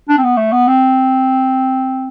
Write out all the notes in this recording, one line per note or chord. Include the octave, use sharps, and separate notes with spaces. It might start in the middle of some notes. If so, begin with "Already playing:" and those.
D4
C4
B3
A3
B3
C4